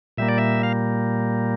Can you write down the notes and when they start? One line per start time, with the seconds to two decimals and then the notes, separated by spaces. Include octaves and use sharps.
0.17 A#2 G3 A#3 E5
0.28 D5
0.38 E5
0.63 F5